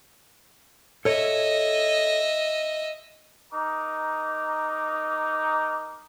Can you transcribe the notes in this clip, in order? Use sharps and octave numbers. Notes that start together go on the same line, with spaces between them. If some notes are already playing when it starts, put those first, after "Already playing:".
A4 C#5 D#5 E5
D#4 A#4 D6